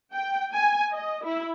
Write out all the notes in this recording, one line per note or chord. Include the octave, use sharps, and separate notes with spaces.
G5
G#5
D#5
E4